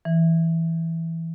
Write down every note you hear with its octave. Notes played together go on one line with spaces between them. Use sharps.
E3